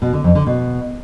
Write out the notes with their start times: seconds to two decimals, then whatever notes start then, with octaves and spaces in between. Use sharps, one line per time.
0.02 B2
0.13 D3
0.24 F2
0.35 D3
0.47 B2